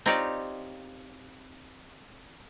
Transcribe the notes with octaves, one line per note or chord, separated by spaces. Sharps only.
C4 D#4 F4 G4 C#5 D5